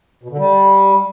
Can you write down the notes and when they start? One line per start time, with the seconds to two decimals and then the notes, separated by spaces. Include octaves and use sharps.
0.23 B2
0.31 D3
0.38 G3